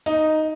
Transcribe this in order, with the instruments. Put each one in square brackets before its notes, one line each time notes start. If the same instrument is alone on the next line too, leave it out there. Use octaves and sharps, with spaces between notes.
[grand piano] D#4